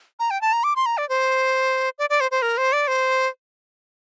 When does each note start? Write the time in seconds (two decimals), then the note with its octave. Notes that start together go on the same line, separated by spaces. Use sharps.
0.19 A#5
0.31 G5
0.41 A5
0.53 A#5
0.64 D6
0.76 C6
0.86 A#5
0.98 D5
1.09 C5
1.99 D5
2.10 D5
2.21 C5
2.31 C5
2.42 A#4
2.58 C5
2.73 D5
2.88 C5